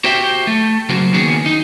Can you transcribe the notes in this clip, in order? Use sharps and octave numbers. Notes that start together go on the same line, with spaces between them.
F#4 G4 C5 E5 G5
A3
C#3 F#3 A#3 F#4 C5
D#3 A#3 B3 C#4 F#4 G#4
D#4